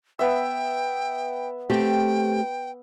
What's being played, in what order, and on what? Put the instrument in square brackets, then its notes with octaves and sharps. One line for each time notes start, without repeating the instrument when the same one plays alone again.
[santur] B3 E5 [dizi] G5
[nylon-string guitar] A3 C4 G4 [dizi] G5